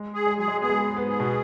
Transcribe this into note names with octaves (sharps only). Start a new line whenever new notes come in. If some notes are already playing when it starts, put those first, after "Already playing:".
Already playing: G#3
G#4
G#3
F#3 G#4
G#3
B3 G#4
G#3
B3
G#2
B3
G#4
B2